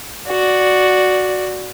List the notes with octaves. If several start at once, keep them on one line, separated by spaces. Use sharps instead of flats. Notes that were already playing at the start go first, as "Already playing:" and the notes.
F#4 D5